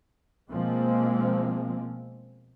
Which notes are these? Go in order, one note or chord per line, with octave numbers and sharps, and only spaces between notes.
B2 F3 G#3 A#3 C4